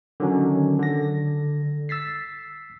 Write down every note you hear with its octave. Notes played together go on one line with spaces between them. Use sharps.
D3 D#3 F#3 C#4
D3 A#6
E6 A6 B6 C7